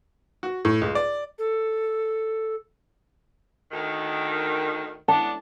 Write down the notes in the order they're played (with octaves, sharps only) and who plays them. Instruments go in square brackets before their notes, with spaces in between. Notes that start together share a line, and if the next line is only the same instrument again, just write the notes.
[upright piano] F#4
A2
C#2
D5
[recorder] A4
[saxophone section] D2 D#3
[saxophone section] B3 D4 [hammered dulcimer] A5